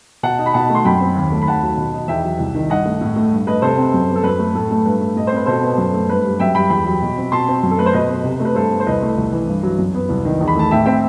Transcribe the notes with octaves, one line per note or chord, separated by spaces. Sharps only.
B2 F#5 A5
D#4
B5
B2 F#5 A5
A3
C6
F#2 G5 B5
C4
D#2
A3
B5
D#2 F#5 A5
F#3
B2
D#4
E2 E5 G5
F#3
C2
D#3
G2 D#5 F#5
A3
A2
A3
G2
A3 B4 D#5
C3 A4 C5
C4
F#2
B3
A4
F#2 B4
A3
A2 A4
A3
G2 B4
A3
A2 D#5
C4 C5
B4
B2 A4 C5
B3
F#2
A3
G2 B4
G3
F#2 E5 G5
G3 G5 B5
E2 G5 B5
F#3
B2
C4
B2 A5 C6
C4
F#2
A4
A3 B4
C5
B2 B4 D#5
B3
C3
A3
B4
G2 A4 C5
B3
C5
C2 B4 D#5
A3
C2
E3
G2
F#3
F#2
B3
C2
D#3
E2
B5
A3 A5
A2 E5 G5
C4 E5 G5